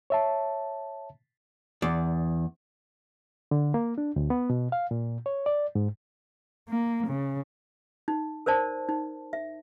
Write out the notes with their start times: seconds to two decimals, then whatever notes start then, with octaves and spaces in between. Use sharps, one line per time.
0.10 C#5 E5 A5
1.82 E2 D5
3.51 D3
3.74 A#3
3.98 D4
4.16 D2
4.30 B3
4.50 B2
4.72 F5
4.91 A#2
5.26 C#5
5.46 D5
5.75 G#2
6.69 A#3
7.07 C#3
8.08 D#4
8.46 A#4 C5 D5 A5
8.89 D#4
9.33 E5